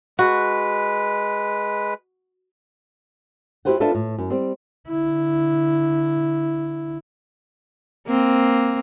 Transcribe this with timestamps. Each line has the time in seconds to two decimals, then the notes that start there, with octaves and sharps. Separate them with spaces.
0.19 G#3 F#4 B4
3.65 E4 F#4 G4 B4 C5 F#5
3.80 D4 F4 A4 B4 E5
3.95 A2
4.18 F#2
4.30 G3 C4
4.89 D3 E4
8.08 A#3 C4